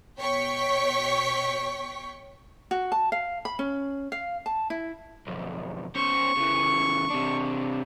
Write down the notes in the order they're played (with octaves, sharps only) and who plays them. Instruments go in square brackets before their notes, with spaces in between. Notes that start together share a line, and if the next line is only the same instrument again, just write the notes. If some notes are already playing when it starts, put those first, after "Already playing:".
[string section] B2 C#5 G5 C#6 B6
[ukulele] F#4
A5
F5
B5
C#4
F5
A5
E4
[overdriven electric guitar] B1 F2
[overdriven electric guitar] C#4 C5 [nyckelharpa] C#6
[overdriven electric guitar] C#3 E3
C3 D4